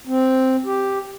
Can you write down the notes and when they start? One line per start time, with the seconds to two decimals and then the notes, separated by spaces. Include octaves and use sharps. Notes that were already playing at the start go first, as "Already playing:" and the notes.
0.07 C4
0.66 G4